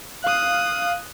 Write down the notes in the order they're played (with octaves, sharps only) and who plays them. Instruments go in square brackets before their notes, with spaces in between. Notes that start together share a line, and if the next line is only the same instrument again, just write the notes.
[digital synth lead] F5 [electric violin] D#6 F#6